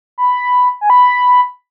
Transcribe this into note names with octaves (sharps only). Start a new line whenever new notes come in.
B5
G#5
B5